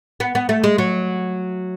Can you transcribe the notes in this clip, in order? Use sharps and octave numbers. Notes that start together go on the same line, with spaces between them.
B3
B3
A3
G#3
F#3